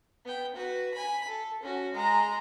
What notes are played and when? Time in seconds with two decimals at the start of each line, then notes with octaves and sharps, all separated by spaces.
0.25 B3 G5
0.55 F#4 B4
0.94 G#5 B5
1.28 A4
1.63 C#4 F#4
1.93 G#3 A#5